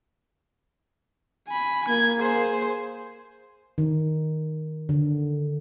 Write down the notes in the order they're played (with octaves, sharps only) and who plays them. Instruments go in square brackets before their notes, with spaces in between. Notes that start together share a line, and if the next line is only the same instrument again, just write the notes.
[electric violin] G#5 B5
[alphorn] A#3 [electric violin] G#6
[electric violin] G#4 C5
[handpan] D#3
D3